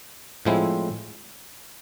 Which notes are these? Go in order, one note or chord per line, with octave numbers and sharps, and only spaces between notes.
A2 F3 G#3 C4 E4